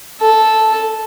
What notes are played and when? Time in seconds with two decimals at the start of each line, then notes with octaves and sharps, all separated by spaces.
0.21 A4